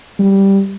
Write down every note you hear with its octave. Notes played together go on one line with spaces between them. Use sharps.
G3